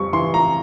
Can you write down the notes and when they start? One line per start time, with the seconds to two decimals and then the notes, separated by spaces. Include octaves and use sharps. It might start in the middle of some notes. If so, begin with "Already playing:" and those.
Already playing: F2 G3 C#6
0.13 E3 C6
0.34 A#5